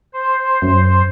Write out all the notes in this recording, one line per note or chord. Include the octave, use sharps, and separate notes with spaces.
C5
F#2